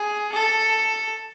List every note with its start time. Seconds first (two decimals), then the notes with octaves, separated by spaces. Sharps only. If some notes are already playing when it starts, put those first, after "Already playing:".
Already playing: G#4
0.32 A4